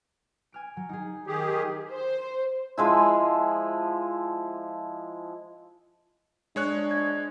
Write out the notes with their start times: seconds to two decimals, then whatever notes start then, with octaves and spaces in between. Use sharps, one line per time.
0.52 G#5 F6 D7
0.77 F#3
0.89 D#4 G#4
1.27 D#3 G4 G#4
1.48 G#5 D#6
1.91 C5
2.78 F3 G#3 E4
6.56 G#3 D4 C#5 F#6
6.91 G#6